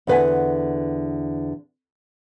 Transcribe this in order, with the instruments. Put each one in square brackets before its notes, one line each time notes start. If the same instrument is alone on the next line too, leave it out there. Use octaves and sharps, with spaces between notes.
[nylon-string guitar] E2 D3 B4 F#5 G#5